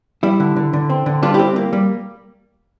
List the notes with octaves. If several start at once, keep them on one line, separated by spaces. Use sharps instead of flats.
G3 E4
D3
D3
D3
C4
D3
G3 D4 F4
C4 E4 G4
A#3
G3